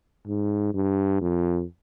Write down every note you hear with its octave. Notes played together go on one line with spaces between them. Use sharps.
G#2
G2
F2